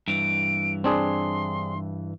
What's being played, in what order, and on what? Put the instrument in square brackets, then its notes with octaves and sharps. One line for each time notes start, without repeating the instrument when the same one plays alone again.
[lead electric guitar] G2 E3 [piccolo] D7
[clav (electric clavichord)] C4 D4 G#4 [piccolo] C6